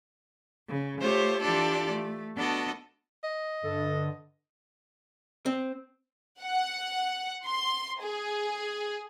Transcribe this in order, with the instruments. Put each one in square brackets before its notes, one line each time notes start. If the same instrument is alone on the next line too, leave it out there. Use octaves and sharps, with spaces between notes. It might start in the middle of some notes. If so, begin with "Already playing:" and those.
[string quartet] C#3
A3 F4 G4 C5 C#5
E3 D4 F4 G4 A4 D5
A3
B3 D4 F#4 A4 D#5
[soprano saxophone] D#5
[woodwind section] G2 A4 [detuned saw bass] D3
[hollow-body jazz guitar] C4
[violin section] F#5
C6
G#4